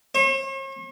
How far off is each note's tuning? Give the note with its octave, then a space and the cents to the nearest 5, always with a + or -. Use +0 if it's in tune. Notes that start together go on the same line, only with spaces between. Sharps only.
C#5 -45